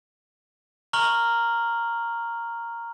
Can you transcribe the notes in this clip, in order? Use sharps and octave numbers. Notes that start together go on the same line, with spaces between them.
A#5 C#6 F6 F#7 G7